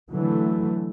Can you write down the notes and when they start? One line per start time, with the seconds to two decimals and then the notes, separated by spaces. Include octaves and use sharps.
0.11 D3 E3 F#3 A3